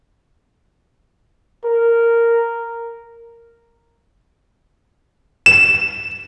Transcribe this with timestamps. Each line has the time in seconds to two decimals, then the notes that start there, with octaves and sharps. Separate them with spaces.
1.64 A#4
5.46 E7